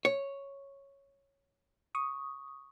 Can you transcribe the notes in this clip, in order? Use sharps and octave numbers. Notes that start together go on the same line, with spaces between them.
C#5
C#6 D#6